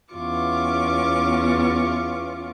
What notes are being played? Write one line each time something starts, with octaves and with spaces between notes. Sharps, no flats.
E2 B3 C#4 F4 C#6 D6